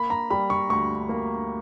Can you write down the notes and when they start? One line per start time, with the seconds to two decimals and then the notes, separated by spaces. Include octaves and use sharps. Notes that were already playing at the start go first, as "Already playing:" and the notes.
Already playing: A#3 B5
0.10 A#5
0.30 G3 B5
0.50 C#6
0.69 D2 C#6
1.09 A#3